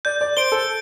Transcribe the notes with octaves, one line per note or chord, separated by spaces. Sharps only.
D5 G6
D5
C5 D7 G7
A4